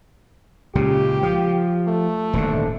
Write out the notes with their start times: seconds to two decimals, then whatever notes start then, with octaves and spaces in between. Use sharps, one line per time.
0.75 C#2 A#2 C#3 G4
1.23 F3
1.88 A3
2.33 D#1 G#2 D3